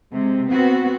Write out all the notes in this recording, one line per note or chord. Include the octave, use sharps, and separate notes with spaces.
C3 G#3
B3 C4 F#4